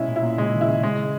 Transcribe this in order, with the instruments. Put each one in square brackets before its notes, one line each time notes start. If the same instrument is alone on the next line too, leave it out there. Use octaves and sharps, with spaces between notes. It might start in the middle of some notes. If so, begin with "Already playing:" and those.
Already playing: [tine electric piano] B2 [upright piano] G#3 C#4 E4
[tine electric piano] A#2
[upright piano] E4
[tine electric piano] A#2
[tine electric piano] C#3 [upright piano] G#3
[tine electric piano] D#3
[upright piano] E4
[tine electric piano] C#3
[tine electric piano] C#3 [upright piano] G#3